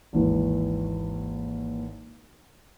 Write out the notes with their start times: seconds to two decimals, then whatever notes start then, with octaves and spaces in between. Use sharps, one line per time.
0.13 G#1 D#2 E3